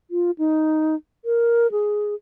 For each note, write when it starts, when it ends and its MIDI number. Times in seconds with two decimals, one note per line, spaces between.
0.11 0.31 65
0.38 0.95 63
1.25 1.71 70
1.71 2.14 68